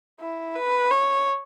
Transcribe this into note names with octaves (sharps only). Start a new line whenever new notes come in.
E4
B4
C#5